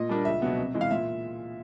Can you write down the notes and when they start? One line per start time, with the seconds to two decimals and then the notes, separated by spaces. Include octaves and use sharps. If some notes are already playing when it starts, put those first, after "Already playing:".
Already playing: A#2 D#5
0.09 G3 A#3 D4
0.25 C#2 E5
0.42 B2 F#3 B3
0.58 C3
0.75 E3 G#3
0.81 F5
0.91 A#2 E5